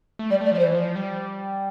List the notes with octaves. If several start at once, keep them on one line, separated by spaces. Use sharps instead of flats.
A3
G3 D5
A3 D5
F3 D5
C5
E3
F3
G3